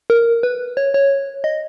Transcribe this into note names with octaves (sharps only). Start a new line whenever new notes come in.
A#4
B4
C#5
C#5
D#5